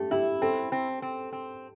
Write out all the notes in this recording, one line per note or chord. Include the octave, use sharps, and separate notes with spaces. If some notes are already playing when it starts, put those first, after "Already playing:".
Already playing: A3 G4
E4 G4
C4 A4
C4
C4
C4